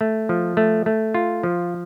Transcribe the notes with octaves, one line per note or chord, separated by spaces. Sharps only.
A3
F3
A3
A3
F4
F3